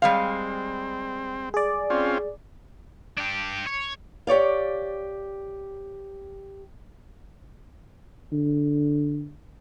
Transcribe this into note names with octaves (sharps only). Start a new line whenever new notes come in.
G3 G#3 C4 F5
G#4 D5
C4 C#4 F4
D4 G4
C#5
G4 C#5 D5 F5
D3